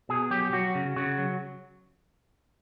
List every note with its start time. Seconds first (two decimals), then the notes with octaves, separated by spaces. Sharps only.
0.09 B2 G#4
0.31 F#3 G4
0.53 F#3 F#4
0.75 C#3
0.96 C#3 F#4
1.18 F#3